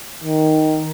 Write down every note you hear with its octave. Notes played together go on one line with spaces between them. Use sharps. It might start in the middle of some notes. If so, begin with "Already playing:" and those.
D#3